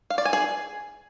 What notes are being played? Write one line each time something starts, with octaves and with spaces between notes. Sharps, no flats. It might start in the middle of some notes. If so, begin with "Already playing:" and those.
F5
D5
G#5
G#4